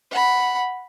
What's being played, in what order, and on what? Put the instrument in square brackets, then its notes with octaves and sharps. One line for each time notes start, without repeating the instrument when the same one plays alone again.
[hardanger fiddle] F#5 B5